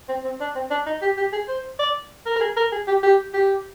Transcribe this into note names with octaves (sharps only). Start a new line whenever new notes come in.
C4
C4
D4
C4
D4
D#4
G4
G4
G#4
C5
D5
A#4
A#4
G#4
A#4
G#4
G4
G4
G4